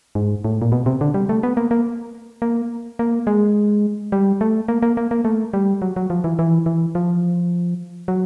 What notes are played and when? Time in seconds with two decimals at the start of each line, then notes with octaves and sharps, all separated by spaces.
0.15 G#2
0.44 A2
0.62 A#2
0.72 B2
0.86 C3
1.01 D3
1.14 G3
1.29 A3
1.43 B3
1.57 A#3
1.71 A#3
2.42 A#3
2.99 A#3
3.27 G#3
4.12 G3
4.41 A3
4.68 A#3
4.82 A#3
4.97 A#3
5.11 A#3
5.25 A3
5.54 G3
5.82 F#3
5.96 F#3
6.10 F3
6.24 E3
6.39 E3
6.66 E3
6.95 F3
8.08 F#3